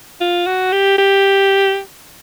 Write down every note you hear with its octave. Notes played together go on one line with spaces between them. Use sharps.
F4
F#4
G4
G4